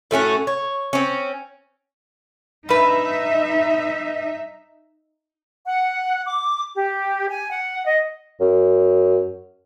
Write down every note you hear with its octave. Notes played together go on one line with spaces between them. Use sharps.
A2 A3 C#4 F#4
C#5
C4 C#4
G2 D#4 B4 E5
F#5
D6
G4
G#5
F#5
D#5
F#2